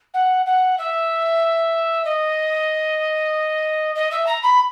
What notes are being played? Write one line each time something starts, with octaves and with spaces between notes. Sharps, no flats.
F#5
F#5
E5
D#5
D#5
E5
A#5
B5